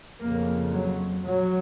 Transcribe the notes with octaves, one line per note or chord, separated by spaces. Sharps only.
F2 C#3 A#3
F#3
F#3